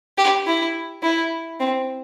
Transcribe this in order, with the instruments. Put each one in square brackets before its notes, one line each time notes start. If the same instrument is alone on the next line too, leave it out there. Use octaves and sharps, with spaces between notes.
[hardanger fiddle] G4
E4
E4
C4